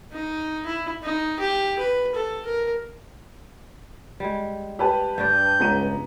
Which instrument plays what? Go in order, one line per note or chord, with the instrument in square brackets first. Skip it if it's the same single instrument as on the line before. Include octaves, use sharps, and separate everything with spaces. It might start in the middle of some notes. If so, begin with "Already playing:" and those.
[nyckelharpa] D#4
E4
D#4
G4
B4
A4
A#4
[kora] G3 G#3
[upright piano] G4 B4 A5
[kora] G2 D4 D5 [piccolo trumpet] G6
[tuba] C#2 [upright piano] B3 A#5 D#7